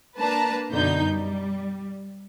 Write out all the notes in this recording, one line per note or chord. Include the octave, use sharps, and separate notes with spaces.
A#3 D4 B4 A5 A#5
F#2 B2 D3 D#4 G6
G3